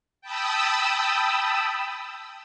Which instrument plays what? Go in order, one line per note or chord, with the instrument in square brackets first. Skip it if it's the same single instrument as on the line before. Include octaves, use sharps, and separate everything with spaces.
[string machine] G5 A5 B5 D#6 E6